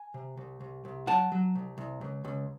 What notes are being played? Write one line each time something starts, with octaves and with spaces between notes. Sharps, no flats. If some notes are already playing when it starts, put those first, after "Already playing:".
Already playing: G#5
C3
C2
C2
C2
F#3 F#5 A5
F#3
C2
C2
C#2
C#2